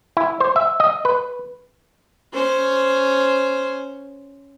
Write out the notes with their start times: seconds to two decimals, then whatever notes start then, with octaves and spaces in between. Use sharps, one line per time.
0.17 E4
0.40 C5
0.56 E5
0.80 D#5
1.05 B4
2.33 C#4 C5